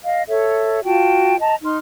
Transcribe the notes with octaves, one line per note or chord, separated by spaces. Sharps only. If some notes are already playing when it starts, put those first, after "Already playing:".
D#5 F5
A4 C#5 E5
F4 F#4 G5 A5
D#5 A5 A#5
D#4 C6 F6